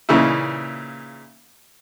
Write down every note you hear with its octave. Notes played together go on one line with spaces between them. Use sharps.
A#2 C#3 E3 D#4 E4